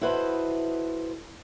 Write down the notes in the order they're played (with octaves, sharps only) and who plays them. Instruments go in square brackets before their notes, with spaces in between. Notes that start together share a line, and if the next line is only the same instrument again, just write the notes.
[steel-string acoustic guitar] E4 F#4 A4 B4 C5 D#5